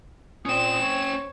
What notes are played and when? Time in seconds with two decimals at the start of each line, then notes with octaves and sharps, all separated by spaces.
0.45 A#2 C4 C#4 G5 D#6 E7
0.80 C#5